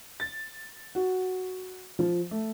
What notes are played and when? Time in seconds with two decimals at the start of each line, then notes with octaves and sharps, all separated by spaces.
0.20 A6
0.95 F#4
1.99 F3
2.31 A3